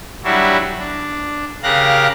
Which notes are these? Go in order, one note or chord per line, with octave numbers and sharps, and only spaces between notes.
F#3 G3 D4 E4 F#4
D4
C#3 G4 A#4 F5 F#6 A#6